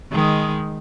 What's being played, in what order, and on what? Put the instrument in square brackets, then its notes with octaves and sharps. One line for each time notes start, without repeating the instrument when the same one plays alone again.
[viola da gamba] D#3 G#3